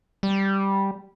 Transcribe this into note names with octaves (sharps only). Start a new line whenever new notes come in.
G3